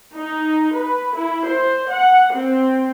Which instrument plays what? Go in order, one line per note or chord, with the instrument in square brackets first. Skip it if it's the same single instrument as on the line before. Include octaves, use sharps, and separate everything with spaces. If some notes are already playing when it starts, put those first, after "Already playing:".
[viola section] D#4
B4
E4
C5
F#5
C4